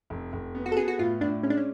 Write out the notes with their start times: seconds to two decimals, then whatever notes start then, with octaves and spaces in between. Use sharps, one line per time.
0.10 F1
0.33 F1
0.55 B3
0.66 F#4
0.72 A4
0.77 B3 G#4
0.88 F#4
0.99 A2 F4
1.21 A2 D4
1.43 G#3 C#4
1.50 D4
1.57 C#4